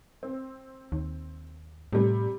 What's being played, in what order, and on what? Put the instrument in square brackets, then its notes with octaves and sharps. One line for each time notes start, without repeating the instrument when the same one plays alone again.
[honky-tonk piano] C4
[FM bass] D#2
[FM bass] A2 [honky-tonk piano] C3 G3